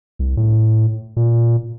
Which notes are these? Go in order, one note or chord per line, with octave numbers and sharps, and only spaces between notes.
C2
A2
A#2